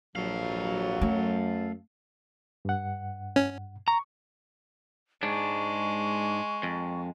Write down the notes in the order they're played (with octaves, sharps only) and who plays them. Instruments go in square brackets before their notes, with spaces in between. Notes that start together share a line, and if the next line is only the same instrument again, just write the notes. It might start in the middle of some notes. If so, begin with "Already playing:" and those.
[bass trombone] A#1 [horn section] F#3 [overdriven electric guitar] A4 F5
[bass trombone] F#2 [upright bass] A3
[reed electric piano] G2 F#5
[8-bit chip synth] C#4
[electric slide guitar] A#5 [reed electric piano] C#6
[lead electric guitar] G#2 D4 [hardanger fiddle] G#3 [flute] C#6
[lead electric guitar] F2